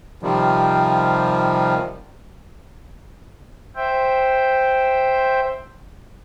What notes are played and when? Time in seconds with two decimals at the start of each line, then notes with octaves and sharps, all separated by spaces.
0.23 C3 D#3 F3 G3
3.76 C5 E5 G5